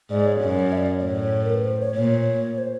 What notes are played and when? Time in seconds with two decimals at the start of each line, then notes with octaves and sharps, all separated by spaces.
0.10 G#2 D5
0.26 C#5
0.41 F#2
0.72 E5
0.77 D5
1.03 A2 C#5
1.44 A#4
1.54 B4
1.65 C5
1.81 C#5
1.96 A#2 C#5
2.58 C5